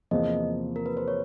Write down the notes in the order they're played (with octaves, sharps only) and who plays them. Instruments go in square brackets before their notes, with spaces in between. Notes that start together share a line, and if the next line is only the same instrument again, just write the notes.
[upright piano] E2 C3 F3 A#3 [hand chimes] D#5
[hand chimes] A#4
B4
C5
C#5